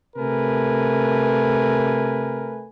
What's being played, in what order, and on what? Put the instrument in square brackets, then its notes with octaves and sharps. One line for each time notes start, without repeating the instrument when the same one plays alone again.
[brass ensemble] C3 A3 A#4 B4 G#5